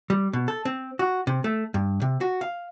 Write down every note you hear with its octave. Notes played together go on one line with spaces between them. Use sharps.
G3
B2
A4
C4
F#4
C3
A3
G2
C3
F#4
F5